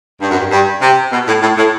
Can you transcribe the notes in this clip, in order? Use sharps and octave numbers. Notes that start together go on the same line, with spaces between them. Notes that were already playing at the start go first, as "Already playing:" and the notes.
G2
F#2
G2
G2
C3
B2
A2
A2
A2